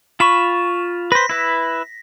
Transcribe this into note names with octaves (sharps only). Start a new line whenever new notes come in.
F4 B5 C#6 E7
B4 C5 A#6 B6
E4 B4 E5